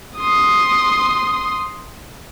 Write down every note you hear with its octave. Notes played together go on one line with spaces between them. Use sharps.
C6 D#6